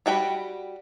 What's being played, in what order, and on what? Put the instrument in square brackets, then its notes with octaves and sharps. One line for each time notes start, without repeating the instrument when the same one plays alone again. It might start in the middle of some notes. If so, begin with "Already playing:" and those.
[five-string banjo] G3 F#4 G5 B5